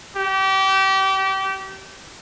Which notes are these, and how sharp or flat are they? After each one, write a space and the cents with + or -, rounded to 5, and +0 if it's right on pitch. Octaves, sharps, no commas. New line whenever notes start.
G4 -30